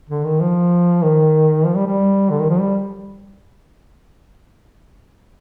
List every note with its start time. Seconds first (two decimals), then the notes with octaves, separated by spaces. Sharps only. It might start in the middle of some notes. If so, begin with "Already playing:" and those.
0.09 D3
0.24 D#3
0.40 F3
1.03 D#3
1.65 F3
1.75 G3
1.86 G3
2.31 D3
2.39 D#3
2.49 F3
2.60 G3